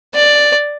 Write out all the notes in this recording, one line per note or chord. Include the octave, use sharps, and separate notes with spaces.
D5